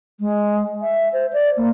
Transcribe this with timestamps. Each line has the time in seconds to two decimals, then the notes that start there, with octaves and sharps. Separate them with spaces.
0.20 G#3
0.81 E5
1.13 C5
1.33 D5
1.57 A#3